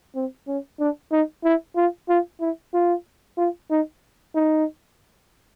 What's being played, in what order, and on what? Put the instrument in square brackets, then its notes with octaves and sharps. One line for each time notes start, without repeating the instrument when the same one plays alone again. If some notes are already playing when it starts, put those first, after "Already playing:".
[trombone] C4
C#4
D4
D#4
E4
F4
F4
E4
F4
F4
D#4
D#4